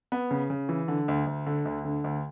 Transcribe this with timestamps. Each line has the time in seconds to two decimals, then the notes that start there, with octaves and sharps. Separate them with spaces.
0.12 B3
0.31 C#3
0.50 C#3
0.69 E3
0.88 D3
1.08 D2
1.27 D2
1.46 D3
1.65 D2
1.85 D3
2.04 D2